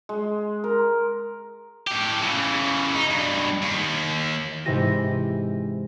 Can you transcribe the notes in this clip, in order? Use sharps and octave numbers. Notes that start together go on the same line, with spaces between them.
G#3
A#4
A2 G4
C#3 E3
D#4
G2 B2
D#2
G#2 C3 E3 G4 A#6 D#7